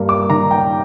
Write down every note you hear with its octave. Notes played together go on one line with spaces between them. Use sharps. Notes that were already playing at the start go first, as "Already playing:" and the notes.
Already playing: G2 G3 A#3
D6
D#3 A#5
G5